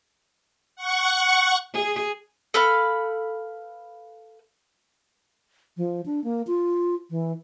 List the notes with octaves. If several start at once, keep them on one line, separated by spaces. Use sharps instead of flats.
F#5 C#6
G#4
A4 B4 F5 B5
F3
D4
A#3
F4
E3